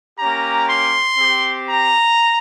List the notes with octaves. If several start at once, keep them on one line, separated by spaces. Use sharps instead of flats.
A#3 C#4 G4 A#5
C6
C4 G4
A#5